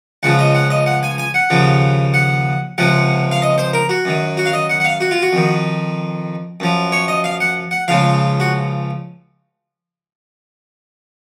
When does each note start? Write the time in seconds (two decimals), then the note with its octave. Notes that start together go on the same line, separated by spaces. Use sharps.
0.23 C#2 C#3 F3 F#5
0.39 D#5
0.55 F#5
0.70 D#5
0.86 F#5
1.03 G#5
1.18 G#5
1.34 F#5
1.50 D#2 C#3 F3
2.14 F#5
2.78 C#2 C3 F3 F#5
3.32 F5
3.42 D#5
3.58 C5
3.74 A#4
3.89 F#4
4.05 F#2 D#3
4.37 F#4
4.46 F5
4.53 D#5
4.70 F#5
4.80 F#5
4.85 F5
5.01 F#4
5.11 F4
5.22 F#4
5.33 F2 D#3
6.60 F#2 F3
6.92 C#5
7.08 D#5
7.24 F5
7.40 F#5
7.71 F#5
7.88 C#2 C#3 F3 F5
8.40 F#4